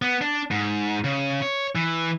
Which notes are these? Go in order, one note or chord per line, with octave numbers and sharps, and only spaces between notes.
B3
D4
G#2
C#3
C#5
E3